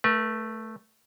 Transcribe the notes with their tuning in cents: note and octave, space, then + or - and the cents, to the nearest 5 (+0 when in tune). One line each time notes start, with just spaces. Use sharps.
A3 +0 B4 -45